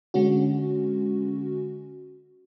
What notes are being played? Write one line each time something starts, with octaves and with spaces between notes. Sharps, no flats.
D3 G#3 C#4 F#4